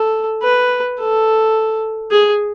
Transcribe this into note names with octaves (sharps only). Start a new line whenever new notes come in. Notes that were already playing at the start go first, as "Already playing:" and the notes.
Already playing: A4
B4
A4
G#4